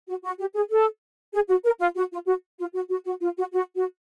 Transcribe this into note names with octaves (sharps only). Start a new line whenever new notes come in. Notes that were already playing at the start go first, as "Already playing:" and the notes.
F#4
F#4
G4
G#4
A4
G#4
F#4
A#4
F4
F#4
F4
F#4
F4
F#4
F#4
F#4
F4
F#4
F#4
F#4